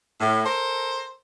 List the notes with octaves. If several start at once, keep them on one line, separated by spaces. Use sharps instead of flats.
A2
A4 A#4 C5